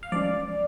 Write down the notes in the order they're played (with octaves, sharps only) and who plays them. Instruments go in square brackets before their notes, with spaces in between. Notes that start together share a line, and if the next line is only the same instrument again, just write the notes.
[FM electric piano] F5
[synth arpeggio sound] F3 G#3 C#4 [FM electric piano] D5